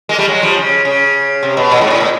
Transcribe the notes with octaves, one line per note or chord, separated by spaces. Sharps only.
G#3 A#3
G3 A3
F#3 G#3
F3 G3
C#3
C#3
C3
B2
A#2
G#2
A2
A#2